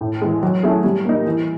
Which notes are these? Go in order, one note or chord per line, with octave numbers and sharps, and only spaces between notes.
A2
E3 G#3
F#3
A3 C#4 E4 G#4
G3
A#3 D#4
E3